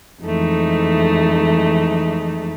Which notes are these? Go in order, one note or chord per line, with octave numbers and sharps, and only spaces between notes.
F2 E3 F3 G#3 A3 D#4